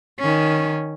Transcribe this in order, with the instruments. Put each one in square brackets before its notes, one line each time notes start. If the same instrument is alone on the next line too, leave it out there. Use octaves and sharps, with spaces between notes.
[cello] D#3 C#4